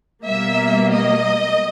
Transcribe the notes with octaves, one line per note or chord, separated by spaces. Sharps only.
B2 G3 A#3 E5
D#5